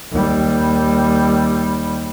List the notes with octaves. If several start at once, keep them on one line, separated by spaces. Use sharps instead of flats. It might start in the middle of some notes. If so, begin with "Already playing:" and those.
D#2 G3